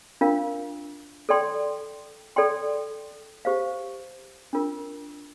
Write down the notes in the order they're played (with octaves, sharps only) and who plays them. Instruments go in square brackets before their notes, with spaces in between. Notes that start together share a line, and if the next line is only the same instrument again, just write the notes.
[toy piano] D4 F4 A#4 F5
A4 D5 G5 C6
A4 D5 G5 C6
G4 C5 F5
D4 F4 A#4